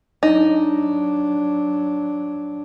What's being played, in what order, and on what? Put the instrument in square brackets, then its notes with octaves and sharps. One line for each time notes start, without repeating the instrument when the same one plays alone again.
[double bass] F#3 D4 [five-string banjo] D#4